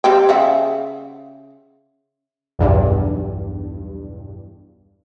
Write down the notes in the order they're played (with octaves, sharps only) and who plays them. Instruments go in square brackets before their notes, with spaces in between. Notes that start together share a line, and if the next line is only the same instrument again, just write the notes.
[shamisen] G3 C4 G5
C#3 E5 F#5
[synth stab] B1 E2 G2